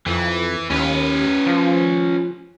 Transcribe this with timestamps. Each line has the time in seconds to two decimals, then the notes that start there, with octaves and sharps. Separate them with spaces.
0.06 F2 E3
0.70 D#2 C#4 B4
1.47 F3